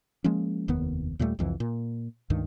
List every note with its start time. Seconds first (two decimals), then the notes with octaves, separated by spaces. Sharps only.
0.24 F3 G#3 A#3 C#4
0.68 F1 D#2 D#3 B3
1.19 D#2 A#2 G3 A3
1.39 C2 F2 E3
1.60 A#2
2.30 C#2 G2 D#3